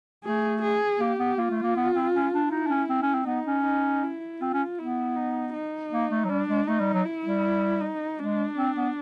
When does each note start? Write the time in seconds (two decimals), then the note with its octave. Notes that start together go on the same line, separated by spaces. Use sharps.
0.24 A3 G#4
0.62 G#4
0.99 A#3 G4
1.19 B3
1.37 A#3 F4
1.50 A3
1.63 A#3
1.76 B3
1.95 C4
2.14 C#4
2.33 D4
2.51 D#4 E4
2.66 D4
2.70 C#4
2.89 C4
3.02 C#4
3.14 C4
3.26 B3 D#4
3.46 C#4
3.65 D#4
4.03 E4
4.41 C4 F4
4.54 C#4
4.79 B3 E4
5.16 D#4
5.54 D#4
5.92 A#3
6.11 A3
6.24 F#3
6.29 G3 D4
6.49 G#3
6.67 A3 D#4
6.80 G3
6.93 F#3
7.05 E4
7.25 G3
7.81 D#4
8.19 G#3 D4
8.57 C4
8.76 B3